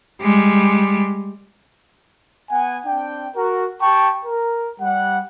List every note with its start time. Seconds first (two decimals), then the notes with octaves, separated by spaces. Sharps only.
0.21 G3 G#3
2.51 B3 F#5 G#5
2.86 C4 D4 G5
3.36 F#4 A#4
3.81 G4 G5 A5 C#6
4.25 A#4
4.80 G3 F#5